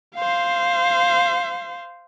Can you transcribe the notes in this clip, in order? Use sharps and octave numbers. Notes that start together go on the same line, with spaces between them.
C5 F5